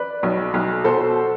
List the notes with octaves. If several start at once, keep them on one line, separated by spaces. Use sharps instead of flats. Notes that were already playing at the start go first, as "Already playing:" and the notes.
Already playing: B4 D5
B1
B1
B2 A4 C5